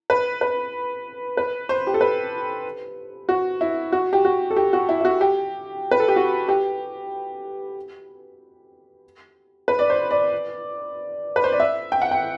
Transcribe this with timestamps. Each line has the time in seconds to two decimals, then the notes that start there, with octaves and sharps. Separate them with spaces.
0.10 B4
0.41 B4
1.37 B4
1.69 C5
1.87 G4
1.94 A4
2.01 B4
3.29 F#4
3.61 E4
3.92 F#4
4.13 G4
4.25 F#4
4.51 A4
4.56 G4
4.73 F#4
4.89 E4
5.01 E4
5.05 F#4
5.21 G4
5.91 B4
6.00 A4
6.08 G4
6.16 F#4
6.48 G4
9.68 B4
9.79 D5
9.90 C5
10.11 D5
11.36 B4
11.44 C5
11.52 D5
11.60 E5
11.92 G5
12.02 F#5
12.11 G5